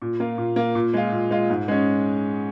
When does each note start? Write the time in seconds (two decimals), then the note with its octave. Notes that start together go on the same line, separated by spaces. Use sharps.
0.02 A#2
0.20 A#3 F4
0.38 A#2
0.56 A#3 F4
0.75 A#2
0.94 G#3 F4
1.12 A#2
1.31 G#3 F4
1.50 G#2
1.68 G#3 C#4